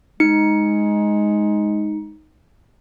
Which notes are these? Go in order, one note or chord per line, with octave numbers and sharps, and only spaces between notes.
G#3 D#4 C#7